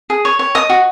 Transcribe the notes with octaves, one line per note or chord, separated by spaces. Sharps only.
G#4
C#5
C#5
D#5 D#6
F#4